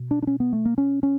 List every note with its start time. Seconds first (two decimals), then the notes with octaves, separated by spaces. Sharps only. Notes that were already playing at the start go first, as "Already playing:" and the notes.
Already playing: B2
0.11 D4
0.22 D4
0.27 C#4
0.40 B3
0.53 A3
0.65 A#3
0.78 C#4
1.03 C#4